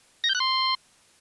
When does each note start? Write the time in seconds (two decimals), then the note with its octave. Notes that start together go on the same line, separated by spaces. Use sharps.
0.24 A#6
0.29 G6
0.35 F#6
0.40 C6